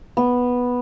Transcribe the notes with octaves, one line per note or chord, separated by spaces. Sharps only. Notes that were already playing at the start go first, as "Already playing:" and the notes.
B3